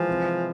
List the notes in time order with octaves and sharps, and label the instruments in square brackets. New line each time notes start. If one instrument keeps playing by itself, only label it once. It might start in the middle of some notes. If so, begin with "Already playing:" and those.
Already playing: [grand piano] E3 G#3 [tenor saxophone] F3
[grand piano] C3